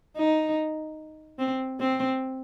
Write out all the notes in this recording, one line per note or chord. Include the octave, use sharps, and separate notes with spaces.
D#4
C4
C4